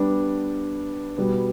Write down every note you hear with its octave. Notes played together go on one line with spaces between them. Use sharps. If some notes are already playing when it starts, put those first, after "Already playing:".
Already playing: G3 B3 D4
B2 G3 B3